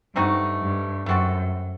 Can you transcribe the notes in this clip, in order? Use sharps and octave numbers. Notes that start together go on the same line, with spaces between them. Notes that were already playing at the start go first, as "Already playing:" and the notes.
G2 A3 C4 D#4 F#4
G2
F#2 A3 C4 F#4 A4